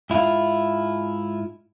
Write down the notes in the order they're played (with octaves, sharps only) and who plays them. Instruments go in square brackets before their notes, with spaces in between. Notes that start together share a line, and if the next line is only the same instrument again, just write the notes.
[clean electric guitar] G#2 E4 F4